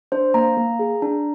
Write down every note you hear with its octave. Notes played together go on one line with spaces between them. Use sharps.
D4 C5
A#3 A#5
A#3
G#4
D4